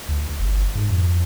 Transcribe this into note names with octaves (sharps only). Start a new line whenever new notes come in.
D2
G1
G#2
F2